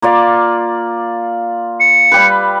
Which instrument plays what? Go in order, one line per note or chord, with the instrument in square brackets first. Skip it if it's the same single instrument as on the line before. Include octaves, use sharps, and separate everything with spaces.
[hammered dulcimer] A#3 F4 D5
[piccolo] C#7
[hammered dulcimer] G3 G4 B4